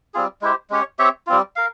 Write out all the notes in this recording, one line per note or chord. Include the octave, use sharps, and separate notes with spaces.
G3 C4 F4 G#4
G#3 E4 G4 C5
G#3 C#4 G4 C#5
C4 G4 C#5 E5
G3 C4 F4
A#4 F5